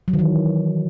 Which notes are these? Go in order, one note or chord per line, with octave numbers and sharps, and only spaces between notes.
F#3
D#3
E3